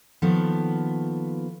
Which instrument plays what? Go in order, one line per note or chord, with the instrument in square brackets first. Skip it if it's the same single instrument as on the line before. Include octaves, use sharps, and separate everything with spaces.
[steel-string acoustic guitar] D#3 F3 A#3 B3 A4